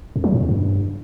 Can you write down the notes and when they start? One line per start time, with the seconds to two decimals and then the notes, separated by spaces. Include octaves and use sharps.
0.16 F2
0.24 F#3
0.32 A2
0.40 E2
0.49 G2